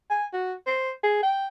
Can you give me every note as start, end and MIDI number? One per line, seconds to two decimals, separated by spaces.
0.10 0.25 80
0.33 0.54 66
0.66 0.91 72
1.03 1.19 68
1.23 1.47 79